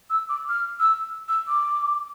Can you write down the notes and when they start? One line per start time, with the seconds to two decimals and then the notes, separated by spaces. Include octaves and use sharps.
0.10 E6
0.29 D6
0.49 F6
0.80 E6
1.29 E6
1.48 D6